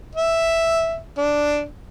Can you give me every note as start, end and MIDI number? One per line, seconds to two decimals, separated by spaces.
0.15 0.98 76
1.18 1.64 62